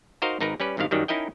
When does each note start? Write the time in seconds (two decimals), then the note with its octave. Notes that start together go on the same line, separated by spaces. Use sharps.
0.22 D#4 F#4 A#4 C5 D#5 F5
0.41 G#1 D#4 A#4 B4 A#5
0.60 G3 C#4 B4 D5
0.77 G#1 G2 C3 D#3 F5
0.91 F#2 D#3 F#3 G3
1.08 C#4 D#4 E4 A#4 D#5 G5